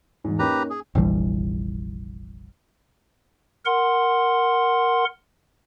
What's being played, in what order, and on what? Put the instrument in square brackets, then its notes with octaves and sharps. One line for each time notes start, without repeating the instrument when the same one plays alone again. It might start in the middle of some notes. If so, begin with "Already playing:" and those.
[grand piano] E2 G#2
[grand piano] A#3 C#4 D#4 [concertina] G4 B4 A#5
[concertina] G#4
[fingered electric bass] F1 A#1 E3 G3
[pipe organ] A#4 F#5 C6